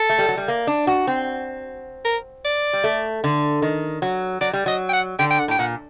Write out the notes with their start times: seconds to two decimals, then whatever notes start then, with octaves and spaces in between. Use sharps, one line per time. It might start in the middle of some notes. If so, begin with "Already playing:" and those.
Already playing: A4
0.09 A3
0.18 G3
0.28 F#3
0.37 G3
0.48 A#3
0.67 D4
0.87 F#4
1.07 C4
2.05 A#4
2.45 D5
2.73 G3
2.84 A3
3.24 D3
3.62 D#3
4.02 F#3
4.41 F#3 D5
4.53 G3
4.66 F#3 D#5
4.89 G5
4.93 F#5
5.19 D3 G5
5.31 G5
5.39 F#5
5.48 A2 G5
5.59 A#2 F#5